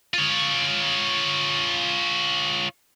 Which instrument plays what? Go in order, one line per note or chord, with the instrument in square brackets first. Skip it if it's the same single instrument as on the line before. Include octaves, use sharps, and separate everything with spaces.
[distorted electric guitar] F4 C#5